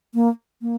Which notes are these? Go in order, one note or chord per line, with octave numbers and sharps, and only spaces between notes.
A#3
A#3